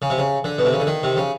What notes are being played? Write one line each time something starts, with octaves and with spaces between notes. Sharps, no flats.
C#3
C3
C#3
D3
B2
C3
C#3
D3
D#3
C3
C#3